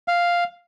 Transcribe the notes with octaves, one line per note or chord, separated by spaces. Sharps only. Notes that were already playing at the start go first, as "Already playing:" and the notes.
F5